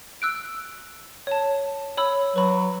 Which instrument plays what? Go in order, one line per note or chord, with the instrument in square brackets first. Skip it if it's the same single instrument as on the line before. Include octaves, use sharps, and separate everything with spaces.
[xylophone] E6 F#6 D7
C#5 A5
C#5 B5 E6
[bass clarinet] F#3 [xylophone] B4 B5